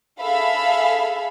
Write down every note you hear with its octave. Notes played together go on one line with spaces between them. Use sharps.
G#4 A4 E5 F5 B5